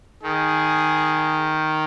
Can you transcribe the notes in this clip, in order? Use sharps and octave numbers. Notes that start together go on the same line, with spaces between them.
D#3 G#4